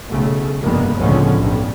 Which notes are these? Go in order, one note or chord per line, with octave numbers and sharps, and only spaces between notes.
B1 C#3 A3
F1 G2 G#3 A#3 B3
C#2 A2 D3 F3 B3 C#4
B1 G2